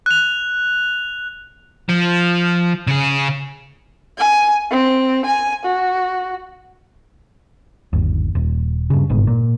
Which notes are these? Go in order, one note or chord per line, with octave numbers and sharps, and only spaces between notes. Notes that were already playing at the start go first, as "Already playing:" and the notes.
F#6 F7
F3
C#3 G#4
G#5
C4
G#5
F#4
G1 D#2
D#1
G2 C#3
G1 G#2 B2
A#2